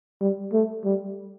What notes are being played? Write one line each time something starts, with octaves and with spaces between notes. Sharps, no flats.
G3
A3
G3